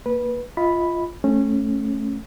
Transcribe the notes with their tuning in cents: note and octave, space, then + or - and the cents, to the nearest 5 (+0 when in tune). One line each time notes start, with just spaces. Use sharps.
A#3 +0 B4 -15
F4 -10 D#5 +30 B5 +0
A3 -10 C#4 -20